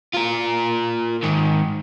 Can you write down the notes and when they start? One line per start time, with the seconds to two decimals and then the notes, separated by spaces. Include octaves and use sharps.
0.14 F4 A#4
1.24 G#2 D#3